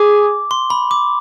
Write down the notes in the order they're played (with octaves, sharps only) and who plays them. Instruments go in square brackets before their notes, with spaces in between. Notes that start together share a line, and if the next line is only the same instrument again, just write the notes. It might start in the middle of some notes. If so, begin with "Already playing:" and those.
Already playing: [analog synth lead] G#4 [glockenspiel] D6
[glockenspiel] C6
B5
D6